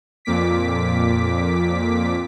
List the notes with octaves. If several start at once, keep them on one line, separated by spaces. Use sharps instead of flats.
F2 A#2 D6 B6